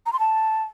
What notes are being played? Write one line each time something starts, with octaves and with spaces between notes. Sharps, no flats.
A#5
C6
A5